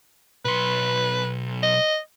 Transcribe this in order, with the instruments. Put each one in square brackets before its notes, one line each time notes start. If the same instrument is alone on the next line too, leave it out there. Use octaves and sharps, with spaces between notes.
[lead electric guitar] B1 C6 [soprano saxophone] B4
[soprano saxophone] D#5